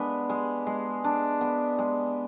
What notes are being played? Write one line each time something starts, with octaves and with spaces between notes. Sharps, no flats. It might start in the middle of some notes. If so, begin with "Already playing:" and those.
Already playing: G#3 B3 D4
G#3
G#3
D4
B3
G#3